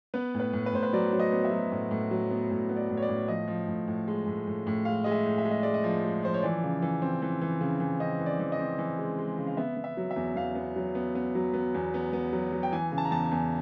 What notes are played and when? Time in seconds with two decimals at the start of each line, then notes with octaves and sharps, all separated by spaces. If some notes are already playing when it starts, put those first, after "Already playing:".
0.14 B3 B4
0.34 A2
0.40 B4
0.53 A2
0.66 B4
0.73 A2 C5
0.83 B4
0.93 F#3 D5
1.13 F#3
1.19 D#5
1.32 B3
1.45 E5
1.52 F#3
1.72 A2
1.91 A2
2.11 F#3
2.31 B3
2.51 A2
2.69 B3
2.76 D5
2.89 A2
2.97 C#5
3.02 D5
3.08 A2
3.28 F3 D#5
3.48 F3
3.68 A2
3.88 A2
4.08 G#3
4.26 A2
4.47 A2
4.67 A2
4.85 G#3 F5
5.04 G#3 D#5
5.12 E5
5.26 A2
5.38 E5
5.45 G#3
5.51 D#5
5.63 G#3 D5
5.74 D#5
5.84 F3
6.04 G#3
6.23 F3 C5
6.34 C#5
6.43 E3 D5
6.63 C#3
6.82 E3
7.02 C4
7.22 E3
7.41 E3
7.61 C#3
7.80 E3
8.00 C4 D#5
8.19 E3
8.26 D5
8.39 E3
8.52 D#5
8.59 C4
8.78 E3
8.98 G#3
9.19 G#3
9.38 C#3
9.47 F5
9.57 B3 E5
9.77 B3
9.84 E5
9.97 F#3
10.11 E5
10.16 E2
10.36 E2 F5
10.55 B3
10.76 F#3
10.95 B3
11.15 B3
11.35 F#3
11.54 B3
11.74 E2
11.94 B3
12.13 B3
12.33 F#3
12.52 F#3
12.63 G5
12.72 E3 G#5
12.92 C#3
12.98 A5
13.05 A#5
13.11 E2 A5
13.24 G#5
13.32 E2